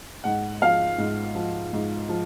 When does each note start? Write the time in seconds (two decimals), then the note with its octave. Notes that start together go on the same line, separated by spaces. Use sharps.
0.24 G#2 F#5
0.61 F3 F5
0.98 G#2
1.35 F3
1.73 G#2
2.09 F3